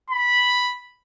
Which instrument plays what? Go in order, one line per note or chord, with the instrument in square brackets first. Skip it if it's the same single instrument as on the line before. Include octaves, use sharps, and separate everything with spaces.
[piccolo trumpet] B5